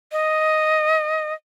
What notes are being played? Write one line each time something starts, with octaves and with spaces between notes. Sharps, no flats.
D#5